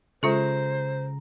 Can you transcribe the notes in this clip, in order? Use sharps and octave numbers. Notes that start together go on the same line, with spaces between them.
C#3 G#3 F4 A4 C5 A#5